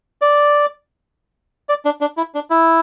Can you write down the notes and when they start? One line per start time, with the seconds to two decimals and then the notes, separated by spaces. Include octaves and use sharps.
0.21 D5
1.69 D5
1.85 D4
2.01 D4
2.17 E4
2.35 D4
2.50 E4